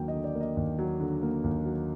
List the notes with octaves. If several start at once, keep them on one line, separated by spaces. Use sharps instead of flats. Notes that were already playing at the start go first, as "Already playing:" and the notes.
Already playing: D#2 D3 F#3 A#3 G5
D#5
D3
D5
A#3
D#5
D#2
F#3
D3
A#3
D#2
F#3